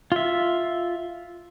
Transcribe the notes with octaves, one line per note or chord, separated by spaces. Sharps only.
F4 E5